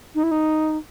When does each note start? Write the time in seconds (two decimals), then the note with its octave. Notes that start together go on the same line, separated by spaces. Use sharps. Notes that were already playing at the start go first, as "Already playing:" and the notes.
0.15 D#4
0.23 E4
0.31 D#4